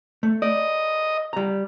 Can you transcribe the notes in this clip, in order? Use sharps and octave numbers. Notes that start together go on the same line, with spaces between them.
A3
D5 D#5
G3 A#5